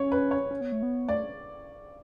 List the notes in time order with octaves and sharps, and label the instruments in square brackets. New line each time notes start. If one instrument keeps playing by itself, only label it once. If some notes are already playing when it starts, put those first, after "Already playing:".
Already playing: [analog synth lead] C#4 [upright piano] C#5
[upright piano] B4
C#5
[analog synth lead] C#4
B3
A3
B3
[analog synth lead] A3 [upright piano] D5